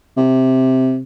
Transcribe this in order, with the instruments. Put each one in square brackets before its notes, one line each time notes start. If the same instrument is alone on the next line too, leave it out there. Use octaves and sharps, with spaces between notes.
[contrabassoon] C3